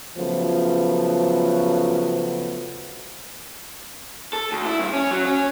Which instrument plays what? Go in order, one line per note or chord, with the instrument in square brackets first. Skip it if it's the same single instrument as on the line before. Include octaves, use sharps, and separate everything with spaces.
[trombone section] C#3 F3 F#3 A3 B3
[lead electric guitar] A4
D2
E4
G2
C#4
F#3
C#4